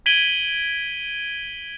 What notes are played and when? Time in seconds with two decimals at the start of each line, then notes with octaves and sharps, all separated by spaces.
0.06 G#6 B6 D7 D#7 F#7 G7